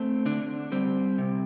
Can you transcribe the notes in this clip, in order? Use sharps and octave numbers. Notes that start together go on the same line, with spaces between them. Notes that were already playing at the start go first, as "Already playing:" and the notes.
Already playing: A3 C4
D3 D4
G3 C4
C3